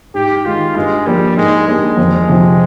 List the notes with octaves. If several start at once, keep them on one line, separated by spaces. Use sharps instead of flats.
G#2 G4
D#3 G#3 F4
G2 G#3
F3 G3 A#3
G#2 G#3
G3 G#3 A#3 D4
F2
C3 F3